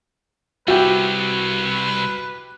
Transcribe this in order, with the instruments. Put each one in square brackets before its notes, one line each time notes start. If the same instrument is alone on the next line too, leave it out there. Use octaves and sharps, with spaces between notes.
[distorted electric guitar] C2 [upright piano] E4 G4 [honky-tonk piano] F#4 [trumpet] B4